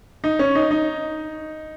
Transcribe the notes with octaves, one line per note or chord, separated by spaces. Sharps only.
D#4
C#4
D#4
D#4